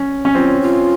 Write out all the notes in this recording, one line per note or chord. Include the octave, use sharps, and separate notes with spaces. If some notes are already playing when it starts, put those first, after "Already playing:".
Already playing: C#4
C#4
C4 F4
F4